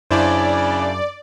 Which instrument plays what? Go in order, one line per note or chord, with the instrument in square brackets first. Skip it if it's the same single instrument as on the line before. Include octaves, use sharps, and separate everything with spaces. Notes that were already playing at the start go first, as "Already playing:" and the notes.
[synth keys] F#2 [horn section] C#3 [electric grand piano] D4 E4 C5 [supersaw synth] D5